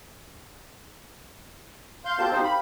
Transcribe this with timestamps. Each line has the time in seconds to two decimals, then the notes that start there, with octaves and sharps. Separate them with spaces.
2.05 F5 C6 G6
2.19 C4 G4 A#4 F5 A5 G6
2.32 C4 D#4 G4 C5
2.44 B5